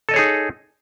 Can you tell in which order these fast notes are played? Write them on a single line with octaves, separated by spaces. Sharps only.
A4 D#5 C#5 G#4 D#4